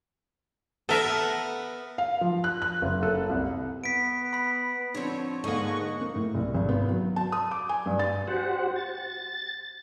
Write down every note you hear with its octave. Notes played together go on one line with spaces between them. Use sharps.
B3 A4 A#4 E5
F5
F3
F#6
F#6
F#1
A4
C2
B3 B6 D7
B5 B6
D3 F3 C4 C#5
G#2 D3 A#3 G#4 D#5 F#5 C#6
A#3
A2
C2
G#1
B3
F#3
A5
D#6
D6
G#5
G2
A6
F#4 G4 C5 F#5
A6